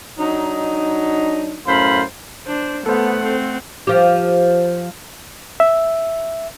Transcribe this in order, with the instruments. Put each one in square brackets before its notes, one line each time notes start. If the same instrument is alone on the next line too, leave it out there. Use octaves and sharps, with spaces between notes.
[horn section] F#3 D4 D#4
F#2 A2 C5 F5 B5
[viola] D4 [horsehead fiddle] C5
[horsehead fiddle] A3 F#5 [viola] B3 [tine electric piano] A4 C5
[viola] C4
[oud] F3 G4
[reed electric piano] E5